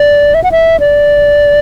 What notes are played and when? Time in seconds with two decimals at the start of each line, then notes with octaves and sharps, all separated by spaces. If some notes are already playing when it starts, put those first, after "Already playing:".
Already playing: D5
0.34 E5
0.44 F#5
0.52 E5
0.80 D5